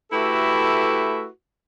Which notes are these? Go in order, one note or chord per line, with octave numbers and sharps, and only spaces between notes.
A3 E4 F#4 G4 A4 B4